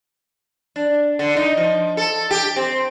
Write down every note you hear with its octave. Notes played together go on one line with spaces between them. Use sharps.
D4
D3
D#4
F3
A4
G4
C4